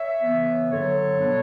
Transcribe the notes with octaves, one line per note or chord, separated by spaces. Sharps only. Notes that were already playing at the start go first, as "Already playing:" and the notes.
Already playing: C#5 E5
C#3 E3 B3
G2 D3 F#3 A4 C#5
B2 G3 B3 D4